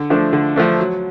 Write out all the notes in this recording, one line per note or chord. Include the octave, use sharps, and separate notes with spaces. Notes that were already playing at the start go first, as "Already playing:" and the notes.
Already playing: D3
F3 A3 D4
D3
F3 A3 D4
F#3